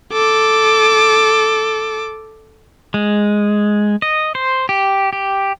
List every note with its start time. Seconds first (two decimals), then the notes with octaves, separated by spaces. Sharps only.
0.13 A4 D6
2.94 G#3
4.02 D#5
4.35 C5
4.69 G4
5.13 G4